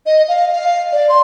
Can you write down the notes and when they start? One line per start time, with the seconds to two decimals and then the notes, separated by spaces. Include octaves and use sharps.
0.06 D#5
0.28 F5
0.53 F5
0.92 D5
1.09 C6